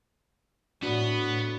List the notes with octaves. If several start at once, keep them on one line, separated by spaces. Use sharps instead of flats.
A2 B3 D4 F#4